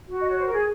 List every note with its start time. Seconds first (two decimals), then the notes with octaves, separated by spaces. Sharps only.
0.09 F#4
0.21 D#5
0.29 C#5
0.38 C5
0.45 A#4
0.53 G#4